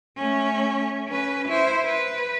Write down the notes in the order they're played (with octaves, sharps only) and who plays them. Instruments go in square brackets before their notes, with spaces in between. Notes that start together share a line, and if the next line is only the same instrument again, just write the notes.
[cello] A3 C#4
C#4 B4
E4 C5
B4